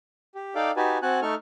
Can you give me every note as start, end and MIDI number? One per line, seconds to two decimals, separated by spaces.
0.35 0.55 67
0.55 0.71 63
0.55 0.71 69
0.55 0.71 74
0.55 0.71 77
0.55 0.71 79
0.55 0.71 86
0.77 0.98 63
0.77 0.98 66
0.77 0.98 67
0.77 0.98 71
0.77 0.98 80
0.77 0.98 81
1.02 1.20 60
1.02 1.20 66
1.02 1.20 78
1.02 1.20 80
1.02 1.20 81
1.02 1.20 90
1.22 1.35 57
1.22 1.35 63
1.22 1.35 69
1.22 1.35 85
1.22 1.35 89